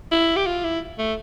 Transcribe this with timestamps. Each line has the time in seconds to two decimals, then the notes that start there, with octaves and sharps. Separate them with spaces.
0.12 E4
0.36 G4
0.47 F4
0.64 E4
0.99 A3